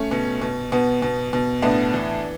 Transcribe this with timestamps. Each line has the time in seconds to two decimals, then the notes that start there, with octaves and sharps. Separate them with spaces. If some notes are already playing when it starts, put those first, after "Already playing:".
Already playing: A3 C#4
0.11 B2
0.41 B2
0.72 B2 B3
1.02 B2
1.33 B2
1.62 A2 B3 D4
1.93 E3